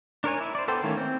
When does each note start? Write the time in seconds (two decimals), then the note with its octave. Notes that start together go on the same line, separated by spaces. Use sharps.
0.24 D4 A#4 C#5 G#5
0.40 E4
0.55 C5 D5
0.68 B3 A4 C5 G5
0.83 D#3 E3 A3 A#3 C#4
0.97 C4